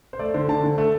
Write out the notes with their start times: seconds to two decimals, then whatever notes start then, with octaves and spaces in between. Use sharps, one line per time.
0.13 C5
0.19 A3 D5
0.34 D3 C5
0.49 D3 A5
0.64 D3
0.78 A3